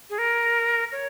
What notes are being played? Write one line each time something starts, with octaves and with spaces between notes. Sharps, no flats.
G#4
A#4
C#5